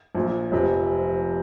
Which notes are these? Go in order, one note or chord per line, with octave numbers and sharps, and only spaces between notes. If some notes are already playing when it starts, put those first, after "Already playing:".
A#1 A#2 F3
F1 F2 C3